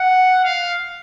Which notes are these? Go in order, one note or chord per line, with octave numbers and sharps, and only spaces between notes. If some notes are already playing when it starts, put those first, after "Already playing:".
Already playing: F#5
F5